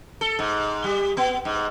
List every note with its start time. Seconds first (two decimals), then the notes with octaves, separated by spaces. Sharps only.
0.21 A4
0.39 G#2
0.84 G3
1.17 B3
1.45 G#2